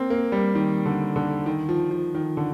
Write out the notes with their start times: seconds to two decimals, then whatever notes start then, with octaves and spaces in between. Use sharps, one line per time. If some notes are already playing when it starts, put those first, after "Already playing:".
Already playing: A#3 C4
0.10 A#3
0.32 G3
0.55 D#3
0.85 D3
1.16 D3
1.46 D#3
1.69 F3
1.91 F3
2.15 D#3
2.37 D3